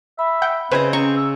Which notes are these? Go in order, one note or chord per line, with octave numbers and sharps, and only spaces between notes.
E5 B5
F#5 G5
C#3 C4 B4 C5 D#5 G#5
C#4 A#5 C#6
E6